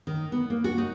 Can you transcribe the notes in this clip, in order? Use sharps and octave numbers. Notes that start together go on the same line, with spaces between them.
D#3
B3
A#3
F#4
D#4